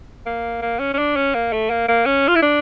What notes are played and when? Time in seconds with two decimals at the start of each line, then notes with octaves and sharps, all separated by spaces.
0.26 A#3
0.62 A#3
0.79 C#4
0.94 C#4
0.99 D4
1.16 C#4
1.35 A#3
1.53 A3
1.70 A#3
1.89 A#3
2.06 C#4
2.28 F4
2.36 E4
2.42 D4